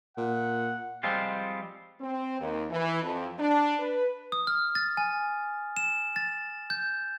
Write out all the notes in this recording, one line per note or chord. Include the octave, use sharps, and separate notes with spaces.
A#2 F#5
F3 G3 G#3 C4 F4
C4
D#2
E3
F2
D4
B4
D#6
F6
A6
G#5
E7
A6
G6